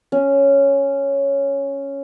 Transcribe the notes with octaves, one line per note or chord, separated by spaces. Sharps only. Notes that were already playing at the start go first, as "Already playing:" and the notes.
C#4